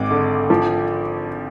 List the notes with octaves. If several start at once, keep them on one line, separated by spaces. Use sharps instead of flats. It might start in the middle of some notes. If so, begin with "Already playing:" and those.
Already playing: G#1 G#3 D6
D3
F3